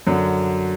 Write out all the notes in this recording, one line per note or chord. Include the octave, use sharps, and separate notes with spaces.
F#2 D3 F#3